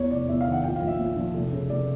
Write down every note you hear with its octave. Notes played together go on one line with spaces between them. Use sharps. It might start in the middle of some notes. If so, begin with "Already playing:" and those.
Already playing: E2 C#5
F1 D5
E2 E5
F5
D#3
F#5
A#1 G5
F5
A#1
E5
A#2
F3
F1
C#3
F1 D5